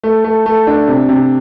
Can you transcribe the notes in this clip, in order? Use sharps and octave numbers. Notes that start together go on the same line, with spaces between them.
A3
A3
A3
D4
C3
C3